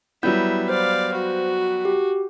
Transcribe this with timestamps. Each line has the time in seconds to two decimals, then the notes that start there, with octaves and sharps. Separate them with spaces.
0.23 F#3 G3 B3 E4 E5 G6
0.69 C5 D5 F5
1.12 F#4
1.85 G4